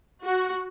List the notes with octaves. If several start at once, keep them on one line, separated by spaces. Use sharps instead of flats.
F#4